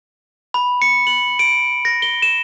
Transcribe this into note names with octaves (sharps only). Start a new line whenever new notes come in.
B5
C#7
F#7
D7
A#6
G7
E7